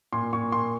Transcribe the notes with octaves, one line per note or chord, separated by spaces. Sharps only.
A#2 C6
A#2 C#6
A#2 C6